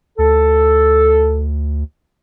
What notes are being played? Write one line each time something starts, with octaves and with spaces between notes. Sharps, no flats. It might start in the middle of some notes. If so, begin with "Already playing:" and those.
D2 A4